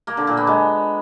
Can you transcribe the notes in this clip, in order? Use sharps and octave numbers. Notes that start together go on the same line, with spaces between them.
A#3
D3
A#2
B3
G#3